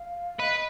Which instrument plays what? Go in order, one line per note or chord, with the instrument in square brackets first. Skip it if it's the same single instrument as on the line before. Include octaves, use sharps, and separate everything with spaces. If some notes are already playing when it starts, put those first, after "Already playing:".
Already playing: [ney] F5
[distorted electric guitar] B4 [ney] D#5